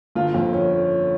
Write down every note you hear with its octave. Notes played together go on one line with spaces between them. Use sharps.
G1 F4
F2
C#4